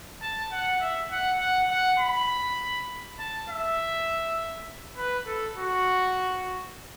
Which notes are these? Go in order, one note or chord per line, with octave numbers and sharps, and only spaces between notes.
A5
F#5
E5
F#5
F#5
F#5
B5
A5
E5
B4
A4
F#4